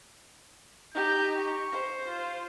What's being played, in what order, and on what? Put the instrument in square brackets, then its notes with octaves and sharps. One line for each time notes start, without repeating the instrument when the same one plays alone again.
[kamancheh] D#4 G4 [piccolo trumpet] G6
[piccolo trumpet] C#6
[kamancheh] C5
[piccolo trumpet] F4